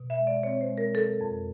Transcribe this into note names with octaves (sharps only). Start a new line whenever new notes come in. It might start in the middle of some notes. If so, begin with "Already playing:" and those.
Already playing: B2
E5
G#3
D5
C4 C#5
C5
G#3
A#4
F#3 A4
F2